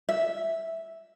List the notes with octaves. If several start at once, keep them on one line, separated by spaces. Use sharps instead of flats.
E5